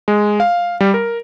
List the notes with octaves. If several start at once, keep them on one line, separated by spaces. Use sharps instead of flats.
G#3
F5
G3
A#4